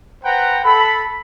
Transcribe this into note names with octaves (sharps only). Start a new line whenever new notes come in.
B4 C5 F#5 G5 A#5
A4 B5